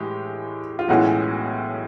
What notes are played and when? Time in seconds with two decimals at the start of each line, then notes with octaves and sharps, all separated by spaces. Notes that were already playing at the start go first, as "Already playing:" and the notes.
Already playing: A2 E3 G#3 G4
0.79 F4
0.88 B1 A2 E3 G#3 C#4 F#4